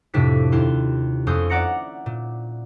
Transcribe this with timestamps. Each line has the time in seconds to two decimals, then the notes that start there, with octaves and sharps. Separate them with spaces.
0.14 F2 A2 C3 D4 E4 B6
0.52 D#2 E4 F4 C6
1.27 F2 C#4 C6 D#6 E6 G6
1.50 D5 E5 F#5 A#5 A#6 C#7
2.06 A#2